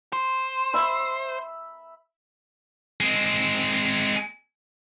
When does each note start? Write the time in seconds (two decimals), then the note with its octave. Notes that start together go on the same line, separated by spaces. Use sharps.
0.13 C5
0.74 E5 B5
3.00 G#3 C4